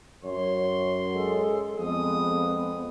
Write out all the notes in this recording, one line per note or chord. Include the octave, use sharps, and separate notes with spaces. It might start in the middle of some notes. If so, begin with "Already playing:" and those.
F#2 C#5 C6
G#3 A4
F2 G#3 B3 D#6